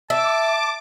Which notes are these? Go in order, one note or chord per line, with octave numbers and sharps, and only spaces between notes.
E5 A5 D6